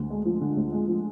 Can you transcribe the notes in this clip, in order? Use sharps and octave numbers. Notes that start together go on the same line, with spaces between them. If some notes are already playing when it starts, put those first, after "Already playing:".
Already playing: D2 D3
G#3
F3
D3
D2
G#3
F3